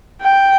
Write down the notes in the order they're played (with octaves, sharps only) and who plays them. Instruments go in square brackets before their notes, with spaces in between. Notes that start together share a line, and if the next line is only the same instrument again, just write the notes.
[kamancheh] G5